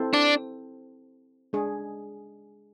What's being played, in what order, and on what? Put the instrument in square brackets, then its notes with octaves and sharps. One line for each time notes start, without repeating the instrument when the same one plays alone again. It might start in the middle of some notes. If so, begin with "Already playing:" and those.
Already playing: [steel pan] C4 E4 A4 C5
[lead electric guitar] D4
[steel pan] G#3 D4 G#4